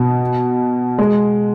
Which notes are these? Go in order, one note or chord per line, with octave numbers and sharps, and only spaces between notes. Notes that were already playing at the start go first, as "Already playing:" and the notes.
Already playing: B2
G#3